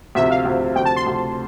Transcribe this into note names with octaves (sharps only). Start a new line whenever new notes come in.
D2 C3 F3 E5
F5
D2 C3 F3
D2 C3 F3 G5
A5
C6
D2 C3 F3